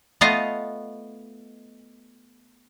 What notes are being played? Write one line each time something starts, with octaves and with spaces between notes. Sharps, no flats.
A3 B3 F4 D#5 F5